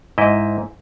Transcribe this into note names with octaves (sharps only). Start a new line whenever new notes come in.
G#2 E4 D#5